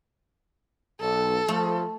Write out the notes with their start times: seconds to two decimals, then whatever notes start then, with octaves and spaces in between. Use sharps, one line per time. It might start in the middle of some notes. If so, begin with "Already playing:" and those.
1.01 B1 A4
1.48 F3 A3